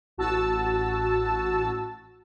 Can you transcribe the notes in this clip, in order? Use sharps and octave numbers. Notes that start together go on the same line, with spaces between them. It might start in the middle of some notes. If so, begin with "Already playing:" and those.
A1 F#4 A5 E6